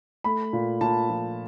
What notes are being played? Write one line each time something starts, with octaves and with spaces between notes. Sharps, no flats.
A3 B5
A#2
A#2 A5
F3